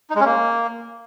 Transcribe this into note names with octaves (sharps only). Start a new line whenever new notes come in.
D#4
G#3
C#4
A#3